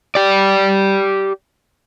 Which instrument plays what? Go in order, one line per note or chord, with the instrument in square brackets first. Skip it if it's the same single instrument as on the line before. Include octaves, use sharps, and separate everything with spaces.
[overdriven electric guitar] G4 D5